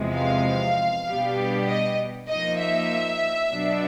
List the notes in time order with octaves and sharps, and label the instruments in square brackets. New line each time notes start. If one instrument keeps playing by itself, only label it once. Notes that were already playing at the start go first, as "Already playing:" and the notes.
Already playing: [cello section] E2 C3 F3 G#3
[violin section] F5
[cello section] B2 G3 B3 D4 G4
[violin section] D#5
[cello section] F3 A#3 D#4 [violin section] D#5
[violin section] E5
[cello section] B2 F#3 B3 D4